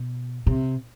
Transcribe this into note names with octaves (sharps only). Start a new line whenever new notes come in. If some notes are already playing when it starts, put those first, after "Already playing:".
Already playing: B2
C3